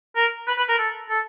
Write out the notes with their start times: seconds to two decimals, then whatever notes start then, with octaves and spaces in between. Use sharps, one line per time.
0.16 A#4
0.48 B4
0.58 B4
0.69 A#4
0.79 A4
1.10 A4